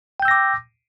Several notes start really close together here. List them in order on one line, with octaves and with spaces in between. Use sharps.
G5 G6 E6 A#6 D6